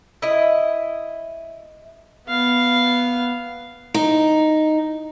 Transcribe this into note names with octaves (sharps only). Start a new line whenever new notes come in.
E4 D#5
B3 F5
D#4